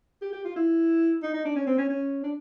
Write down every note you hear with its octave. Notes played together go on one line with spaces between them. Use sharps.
G4
G4
F4
E4
D#4
D#4
D4
C#4
C4
C#4
C#4
D4